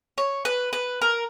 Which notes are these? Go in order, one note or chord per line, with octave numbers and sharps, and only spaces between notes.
C#5
B4
B4
A#4